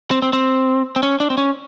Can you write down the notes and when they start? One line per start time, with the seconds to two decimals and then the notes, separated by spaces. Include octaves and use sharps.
0.11 C4
0.22 C4
0.33 C4
0.96 C4
1.03 C#4
1.20 D4
1.30 C4
1.38 C#4